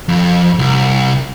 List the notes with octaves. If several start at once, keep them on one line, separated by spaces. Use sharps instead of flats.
F2
C2